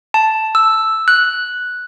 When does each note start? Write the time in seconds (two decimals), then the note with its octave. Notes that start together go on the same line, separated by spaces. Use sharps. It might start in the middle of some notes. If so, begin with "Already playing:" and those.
0.14 A5
0.55 E6
1.08 F#6